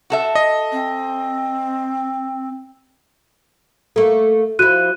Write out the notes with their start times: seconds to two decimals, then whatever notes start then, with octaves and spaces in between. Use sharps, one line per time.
0.10 F#4 A4 E5
0.35 D#5
0.72 C4
3.96 A3 A#3 A4
4.59 F3 E4 F#4 F#6 D#7